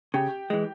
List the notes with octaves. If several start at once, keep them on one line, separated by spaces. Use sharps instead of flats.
C#3 G4 G5
E3 G#3